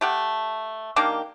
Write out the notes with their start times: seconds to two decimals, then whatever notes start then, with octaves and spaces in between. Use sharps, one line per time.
0.01 A3 G4 F#5
0.96 D#3 A#3 D4 G4